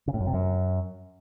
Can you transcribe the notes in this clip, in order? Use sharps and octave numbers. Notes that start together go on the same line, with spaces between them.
C#3
A2
F#2
C3
F#2